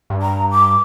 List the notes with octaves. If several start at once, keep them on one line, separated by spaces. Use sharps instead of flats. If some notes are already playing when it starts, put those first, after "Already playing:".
G2
A#5
D6